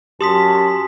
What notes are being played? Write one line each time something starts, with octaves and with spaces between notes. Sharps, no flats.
F#2 G4 A5 C6 D#6 B6